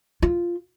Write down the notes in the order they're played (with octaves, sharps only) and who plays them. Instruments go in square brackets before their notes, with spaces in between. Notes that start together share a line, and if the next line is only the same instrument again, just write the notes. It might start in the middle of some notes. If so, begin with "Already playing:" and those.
[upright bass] F4